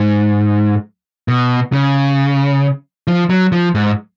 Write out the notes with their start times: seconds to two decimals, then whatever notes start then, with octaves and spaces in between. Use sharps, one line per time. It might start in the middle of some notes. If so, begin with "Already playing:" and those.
Already playing: G#2
1.28 B2
1.72 C#3
3.07 F3
3.30 F#3
3.52 F3
3.75 G#2